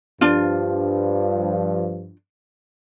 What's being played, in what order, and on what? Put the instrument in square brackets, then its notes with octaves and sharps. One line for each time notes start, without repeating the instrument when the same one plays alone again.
[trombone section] G2 F3 [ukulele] D4 F4